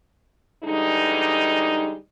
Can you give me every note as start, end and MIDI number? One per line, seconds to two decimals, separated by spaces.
0.64 1.95 50
0.64 1.95 52
0.64 1.95 55
0.64 1.95 56
0.64 1.95 63